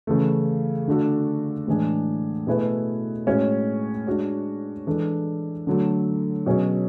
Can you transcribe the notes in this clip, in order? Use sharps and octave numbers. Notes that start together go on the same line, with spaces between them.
C#3 E3 A3
D3 A3 D4 F#4 A4
A2 E3 G#3 D4 G#4
B2 A3 E4 G#4 B4
A2 G#3 C#4 F#4 C#5
G#3 D4 F#4 C#5
E3 G#3 D4 A4
D3 F#3 A3
B2 F#3 C#4 G#4